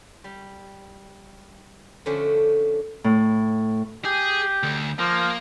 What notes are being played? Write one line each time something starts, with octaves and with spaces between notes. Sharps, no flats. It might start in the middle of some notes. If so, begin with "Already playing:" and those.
G3
D3 F3 A3 C#4 D4
A2
G4 G#4
D2
F3 A#3